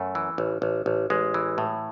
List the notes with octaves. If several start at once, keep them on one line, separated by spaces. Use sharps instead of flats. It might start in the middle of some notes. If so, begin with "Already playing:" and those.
Already playing: F#2 A3
E3
A1
A1
A1
A1 G#3
E3
A2